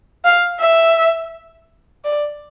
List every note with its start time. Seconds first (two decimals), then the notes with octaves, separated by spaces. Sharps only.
0.25 F5
0.61 E5
2.05 D5